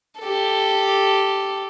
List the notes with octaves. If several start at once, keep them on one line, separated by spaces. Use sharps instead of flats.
G4 A4